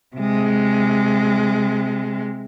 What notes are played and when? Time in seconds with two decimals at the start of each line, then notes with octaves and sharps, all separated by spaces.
0.17 C3 G#3